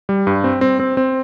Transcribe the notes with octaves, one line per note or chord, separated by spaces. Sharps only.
G3
G2
C4
C4
C4
C4